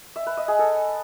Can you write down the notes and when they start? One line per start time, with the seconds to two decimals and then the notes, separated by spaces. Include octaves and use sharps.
0.16 E5
0.27 B4
0.37 D#5
0.48 G#4
0.59 A4